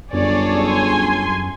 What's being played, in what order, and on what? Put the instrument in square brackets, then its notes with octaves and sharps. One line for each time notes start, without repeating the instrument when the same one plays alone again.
[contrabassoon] G1 [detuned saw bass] F#2 [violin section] G#4 A4 C#5 [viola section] D5
[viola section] G#5 C6